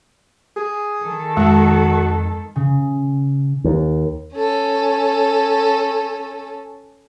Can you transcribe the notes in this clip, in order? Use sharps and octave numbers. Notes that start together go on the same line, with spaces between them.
G#4
D#3 A4
F2 G#3 F#4
C#3
D#2
C#4 A4